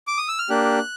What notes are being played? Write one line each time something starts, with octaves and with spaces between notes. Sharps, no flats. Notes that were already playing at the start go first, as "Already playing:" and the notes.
D6
D#6
E6
F6
A#3 D4 G4 F#6